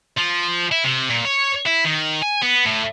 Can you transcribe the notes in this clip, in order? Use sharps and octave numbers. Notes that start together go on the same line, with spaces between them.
F3
E4
C3
A#2
C#5
E4
D#3
G#5
B3
A2